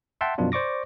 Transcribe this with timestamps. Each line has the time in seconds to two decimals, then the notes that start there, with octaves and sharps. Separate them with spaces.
0.21 E5 F#5 G5 A5 C6
0.38 F#2 B2 F3 D4 F4
0.52 C5 D5 C#6 D6 A#6